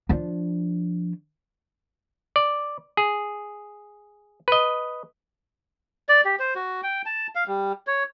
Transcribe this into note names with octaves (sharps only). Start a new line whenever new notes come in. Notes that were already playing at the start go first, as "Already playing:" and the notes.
F3 D4
D5
G#4
B4 D#5
D5
G4
C5
F#4
G5
A5
F5
G3
C#5